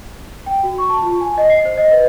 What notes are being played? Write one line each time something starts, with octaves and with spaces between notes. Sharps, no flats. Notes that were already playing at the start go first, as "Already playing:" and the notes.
G5
F#4
C#6
A5
F4
G#5
D#5
C7
C5
D#5
B4